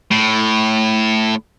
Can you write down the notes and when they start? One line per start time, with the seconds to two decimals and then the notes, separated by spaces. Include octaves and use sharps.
0.11 A2